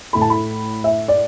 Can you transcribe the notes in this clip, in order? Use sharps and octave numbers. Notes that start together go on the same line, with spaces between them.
A2 A3 E4 B5
A5
B5
E5
D5